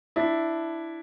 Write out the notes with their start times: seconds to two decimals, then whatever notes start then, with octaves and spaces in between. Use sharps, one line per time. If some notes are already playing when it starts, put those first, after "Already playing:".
0.16 D4 E4